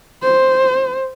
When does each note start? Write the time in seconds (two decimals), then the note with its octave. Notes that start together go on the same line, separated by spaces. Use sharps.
0.23 C5